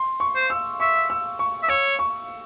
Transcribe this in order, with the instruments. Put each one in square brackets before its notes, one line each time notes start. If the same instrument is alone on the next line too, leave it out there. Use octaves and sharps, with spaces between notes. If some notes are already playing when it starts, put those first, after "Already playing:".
Already playing: [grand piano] C6
C#6
[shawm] C5
[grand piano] E6
[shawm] E5 [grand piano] C#6
[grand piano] E6
C#6
[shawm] E5
[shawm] C#5 [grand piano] E6
[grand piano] C#6